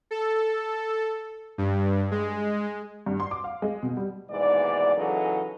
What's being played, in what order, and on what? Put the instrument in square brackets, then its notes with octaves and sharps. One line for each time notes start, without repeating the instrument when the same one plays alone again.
[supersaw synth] A4
G2
G#3
[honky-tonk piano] G2
C6
D6
F5
G#3
B2
G3
[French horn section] D#2 G#2 B2 E3 D5
C#3 E3 F#3 G#3 D#4 A4